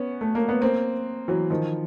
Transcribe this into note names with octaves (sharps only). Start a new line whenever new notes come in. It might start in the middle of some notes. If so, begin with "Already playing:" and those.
Already playing: B3 C#4
A3
A#3
B3
A#3 C4
E3 F#3
D#3 F3